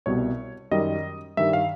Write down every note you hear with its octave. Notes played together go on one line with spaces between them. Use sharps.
C2 B2 G3 C#5
F#2 D#3 G3 D#5
G2 D#3 G3 E5
F5